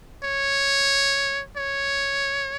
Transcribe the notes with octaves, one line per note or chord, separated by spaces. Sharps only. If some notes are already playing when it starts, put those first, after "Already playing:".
C#5
C#5